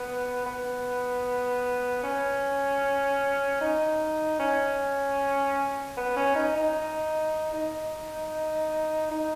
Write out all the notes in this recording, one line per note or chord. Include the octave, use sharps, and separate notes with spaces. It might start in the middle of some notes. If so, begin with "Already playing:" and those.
Already playing: B3
B3
C#4
D#4
C#4
B3
C#4
D#4
D#4
D#4
D#4